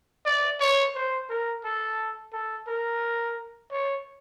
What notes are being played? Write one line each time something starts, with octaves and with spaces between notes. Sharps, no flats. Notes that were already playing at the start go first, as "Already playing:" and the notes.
D5
C#5
C5
A#4
A4
A4
A#4
C#5